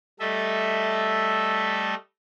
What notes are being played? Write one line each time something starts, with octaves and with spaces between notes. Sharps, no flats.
G3 A3 A4 D#5 E5